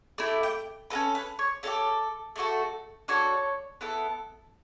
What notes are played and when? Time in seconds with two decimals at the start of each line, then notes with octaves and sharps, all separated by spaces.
0.18 A3 E4 G4
0.43 G5
0.90 C#4 F#4 A4 B4
1.15 B4
1.39 C#5
1.63 C#4 E4 G4 A4
2.36 A3 D4 F#4 A4
3.08 D4 F#4 A4 C#5
3.81 B3 E4 A4